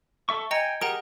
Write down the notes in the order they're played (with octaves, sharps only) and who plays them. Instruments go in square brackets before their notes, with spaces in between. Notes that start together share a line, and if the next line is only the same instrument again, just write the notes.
[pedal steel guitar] A4 E5 C#6
[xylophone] D#5 A#5 C#7 [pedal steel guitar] G5 G#5
[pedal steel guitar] G4 G#4 A#4 [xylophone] F#5 A#5 D7